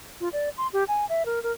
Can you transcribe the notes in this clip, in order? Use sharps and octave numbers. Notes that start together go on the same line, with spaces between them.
F4
D5
C6
G4
G#5
E5
A#4
A#4